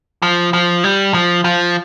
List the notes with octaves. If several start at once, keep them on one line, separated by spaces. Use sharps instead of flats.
F3
F3
G3
F3
F3